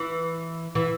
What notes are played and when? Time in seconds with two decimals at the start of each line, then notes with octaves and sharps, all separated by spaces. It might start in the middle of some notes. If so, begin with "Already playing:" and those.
Already playing: E3
0.75 E3